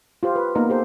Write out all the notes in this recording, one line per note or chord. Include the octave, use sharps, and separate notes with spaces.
F4 G4 C5
B4
A#3 B3 D#4 A#4
G4 A4 C5